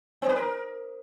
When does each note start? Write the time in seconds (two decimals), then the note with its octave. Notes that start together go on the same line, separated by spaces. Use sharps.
0.22 B3
0.29 B4
0.36 A#4